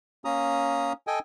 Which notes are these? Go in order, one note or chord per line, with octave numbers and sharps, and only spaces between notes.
A#3 C#4 A#5 D#6
A4 D#5 G5 G#5